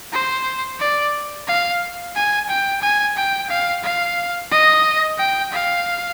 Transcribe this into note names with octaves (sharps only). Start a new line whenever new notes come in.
C5
D5
F5
G#5
G5
G#5
G5
F5
F5
D#5
G5
F5